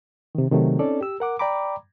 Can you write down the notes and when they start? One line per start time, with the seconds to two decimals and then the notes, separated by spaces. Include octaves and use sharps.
0.35 C3 D#3
0.51 C3 D#3 F#3 A3
0.79 C4 C#4 D#4 A4 D5
1.01 G4 E6
1.20 A#4 F#5 D6
1.39 D5 G5 A#5 B5 D6